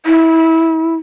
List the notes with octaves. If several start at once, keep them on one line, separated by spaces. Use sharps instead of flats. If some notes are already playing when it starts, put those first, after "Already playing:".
E4